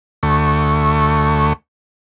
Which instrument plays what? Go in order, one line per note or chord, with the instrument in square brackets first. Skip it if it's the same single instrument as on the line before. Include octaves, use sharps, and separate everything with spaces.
[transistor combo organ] D2 A3 C#6